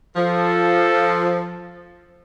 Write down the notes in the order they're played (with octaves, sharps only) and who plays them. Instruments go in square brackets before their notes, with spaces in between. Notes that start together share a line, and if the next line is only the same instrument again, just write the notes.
[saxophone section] F3 [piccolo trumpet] A4